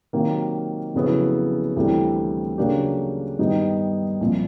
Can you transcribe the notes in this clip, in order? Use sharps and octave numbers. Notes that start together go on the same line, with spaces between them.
C3 D#3 F#3 A#3
F2 C#3 F#3 B3 E4
D2 C3 E3 G3 C4
C#3 F#3 A#3 D4 G4
G2 D#3 G3 B3 D#4
C2 A#2 F3